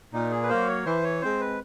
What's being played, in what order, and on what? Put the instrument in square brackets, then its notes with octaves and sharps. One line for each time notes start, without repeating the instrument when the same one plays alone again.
[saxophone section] A#2 [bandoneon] D#4
[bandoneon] G#4
B4
[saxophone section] F#3 A#3 [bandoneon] C5
[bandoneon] C#5
[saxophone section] E3 [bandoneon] C5
[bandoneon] C#5
[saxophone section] G#3 C4 [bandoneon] C5
[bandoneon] B4